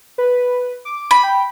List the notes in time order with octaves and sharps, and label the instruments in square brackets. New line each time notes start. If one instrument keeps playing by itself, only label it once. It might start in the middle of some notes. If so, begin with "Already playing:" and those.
[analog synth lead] B4
D6
[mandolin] B5
[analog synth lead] G5